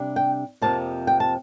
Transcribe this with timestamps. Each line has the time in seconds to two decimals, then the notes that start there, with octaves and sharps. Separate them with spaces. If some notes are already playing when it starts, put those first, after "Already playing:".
Already playing: C3 G3 D4
0.16 G5
0.62 F2 C3 F3 A#3 A5
1.07 G5
1.20 A5